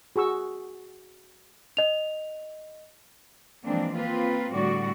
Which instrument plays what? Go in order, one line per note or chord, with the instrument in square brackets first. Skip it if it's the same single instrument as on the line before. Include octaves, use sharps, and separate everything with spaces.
[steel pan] F#4 G#4 C#6 E6
[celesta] D#5 F7
[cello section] E3 F3 G#3 A#3 C4 D4
A#3 C4 F4 B4
A2 D3 G3 F#4 D5